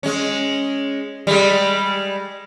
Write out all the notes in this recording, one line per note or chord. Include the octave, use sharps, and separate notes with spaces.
G#3 C#4
G3 G#3